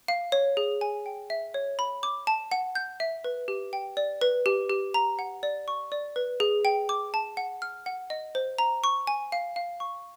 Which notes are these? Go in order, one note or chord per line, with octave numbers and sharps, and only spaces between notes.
F5
C#5
G#4
G#5
G5
E5
C#5
B5
D6
A5
F#5
G6
E5
B4
G4
G5
D5
B4
G4
G4
A#5
F#5
D5
C#6
D5
B4
G#4
G5
D6
A5
F#5
F6
F#5
D#5
C5
A#5
C#6
G#5
F5
F5
C#6